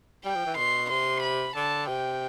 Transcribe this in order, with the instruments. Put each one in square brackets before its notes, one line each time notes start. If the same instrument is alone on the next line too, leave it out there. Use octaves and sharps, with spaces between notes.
[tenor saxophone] G3 [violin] G5
[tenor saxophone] F3
E3
[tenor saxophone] B2 [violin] C6
[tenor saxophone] C3 [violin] C6
[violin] B5
[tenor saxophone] D3 [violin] A5
[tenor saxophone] C3 [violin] G5